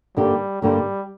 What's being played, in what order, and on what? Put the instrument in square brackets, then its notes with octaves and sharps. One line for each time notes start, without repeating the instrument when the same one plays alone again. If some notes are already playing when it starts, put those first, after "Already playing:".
[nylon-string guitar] G2 D3 A#3 G4 [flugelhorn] G3
[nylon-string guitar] G2 D3 A#3 G4 [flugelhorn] G3